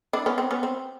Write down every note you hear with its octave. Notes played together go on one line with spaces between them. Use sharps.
D4 E4
B3 C#4
C4
B3 C#4
C4